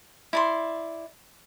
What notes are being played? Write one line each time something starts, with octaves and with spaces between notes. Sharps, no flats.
E4 D5 C6